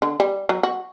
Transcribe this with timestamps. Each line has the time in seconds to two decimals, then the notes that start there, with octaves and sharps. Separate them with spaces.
0.02 D3
0.20 G3
0.49 F#3
0.63 F#4